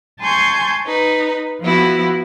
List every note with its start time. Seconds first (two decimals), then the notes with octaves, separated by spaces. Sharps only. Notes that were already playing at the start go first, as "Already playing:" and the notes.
0.21 G#5 A5 C6 C#6 G6 G#6
0.85 D#4 B4
1.61 F3 B3 E4 F#4